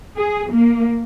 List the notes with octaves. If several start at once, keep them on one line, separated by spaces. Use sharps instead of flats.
G#4
A#3